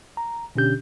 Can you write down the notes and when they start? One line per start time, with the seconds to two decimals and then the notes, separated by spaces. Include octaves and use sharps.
0.17 A#5
0.55 B2 D3 C#4 D4 G4 G6